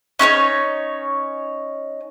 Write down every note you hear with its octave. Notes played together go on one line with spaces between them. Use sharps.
C#4 D#4 C5 C#5